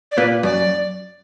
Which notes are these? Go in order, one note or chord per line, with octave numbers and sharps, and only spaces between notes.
D5
A#2 B4
F#2 D5